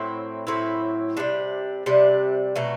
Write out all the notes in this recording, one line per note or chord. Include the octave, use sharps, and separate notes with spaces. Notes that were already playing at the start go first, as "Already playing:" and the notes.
Already playing: A2 F#3 C4 E4
A2 F#3 C4 E4
C3 G3 D4
C3 G3 D4
B2 F#3 A3